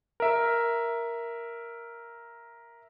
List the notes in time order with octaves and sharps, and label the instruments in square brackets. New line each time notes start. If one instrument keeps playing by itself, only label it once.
[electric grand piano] A#4 E5